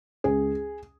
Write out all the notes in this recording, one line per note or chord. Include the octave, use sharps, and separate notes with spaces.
C#2 G#4